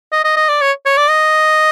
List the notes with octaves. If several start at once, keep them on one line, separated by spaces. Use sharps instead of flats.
D#5
D#5
D#5
D5
C#5
C#5
D5
D#5